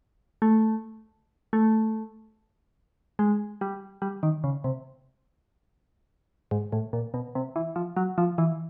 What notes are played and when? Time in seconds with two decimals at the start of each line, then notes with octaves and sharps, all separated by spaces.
0.42 A3
1.53 A3
3.19 G#3
3.61 G3
4.02 G3
4.23 D#3
4.44 C#3
4.64 C3
6.51 G#2
6.73 A2
6.93 A#2
7.14 B2
7.35 C3
7.56 E3
7.76 F3
7.97 F#3
8.18 F3
8.38 E3